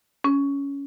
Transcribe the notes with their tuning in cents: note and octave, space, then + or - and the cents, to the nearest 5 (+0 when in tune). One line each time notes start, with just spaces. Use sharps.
C#4 +15